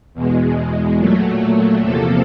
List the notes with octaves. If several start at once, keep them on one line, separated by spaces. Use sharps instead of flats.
E2 B2 G#3
A#2 F#3 A3
E2 C3 F3 A#3 A4